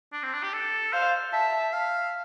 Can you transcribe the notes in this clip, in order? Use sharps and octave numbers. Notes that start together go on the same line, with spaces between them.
D4
C4
D4
G4
A4
C5 F5
E5 A5
F5